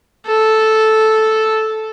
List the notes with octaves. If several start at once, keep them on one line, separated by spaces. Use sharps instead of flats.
A4